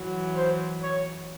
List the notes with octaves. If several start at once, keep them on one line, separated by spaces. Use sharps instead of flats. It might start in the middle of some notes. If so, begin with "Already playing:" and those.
Already playing: E3 F#3
C5
C#5